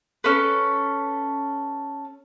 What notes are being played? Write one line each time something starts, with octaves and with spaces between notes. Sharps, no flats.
C#4 A4 B4